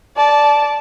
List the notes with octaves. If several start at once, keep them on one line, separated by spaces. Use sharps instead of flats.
D5 A5